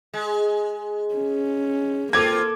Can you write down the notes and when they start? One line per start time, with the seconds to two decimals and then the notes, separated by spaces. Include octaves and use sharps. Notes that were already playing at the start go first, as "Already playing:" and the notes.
0.14 G#3
1.14 C#4
2.13 A#3 C4 F4 A4 D6 G#6